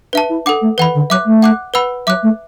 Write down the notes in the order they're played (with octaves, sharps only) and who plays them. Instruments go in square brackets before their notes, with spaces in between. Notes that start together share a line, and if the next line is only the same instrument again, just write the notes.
[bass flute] D4 [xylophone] B4 E5 A5
[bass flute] E4
[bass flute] D4 [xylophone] A4 F#5 D6
[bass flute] A3
[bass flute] E3 [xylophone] B4 F#5 B5
[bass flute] D3
[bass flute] F#3 [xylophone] E5 D6 F#6
[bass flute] A3
[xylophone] F#5 D6 F#6
B4 F#5 B5 E6
[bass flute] F#3 [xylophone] E5 D6 F#6
[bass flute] A3